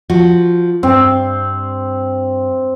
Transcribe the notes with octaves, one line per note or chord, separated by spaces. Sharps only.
F3 F#4
G2 C4